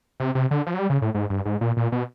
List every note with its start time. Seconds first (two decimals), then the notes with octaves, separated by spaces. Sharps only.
0.20 C3
0.35 C3
0.51 D3
0.67 F3
0.74 F#3
0.79 G3
0.90 C#3
1.02 A2
1.15 G#2
1.30 G2
1.45 G#2
1.61 A#2
1.77 A#2
1.92 B2